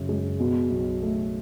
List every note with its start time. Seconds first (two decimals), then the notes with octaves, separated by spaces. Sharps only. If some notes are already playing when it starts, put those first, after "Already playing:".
Already playing: F#2 C#3
0.09 G#3
0.39 B2
0.70 B1
1.02 A3